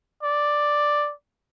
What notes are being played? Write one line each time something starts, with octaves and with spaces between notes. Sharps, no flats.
D5